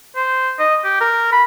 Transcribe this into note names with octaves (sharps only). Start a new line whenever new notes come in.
C5
D#5
G4
A#4
B5